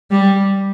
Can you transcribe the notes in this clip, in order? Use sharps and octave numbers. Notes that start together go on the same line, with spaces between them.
G3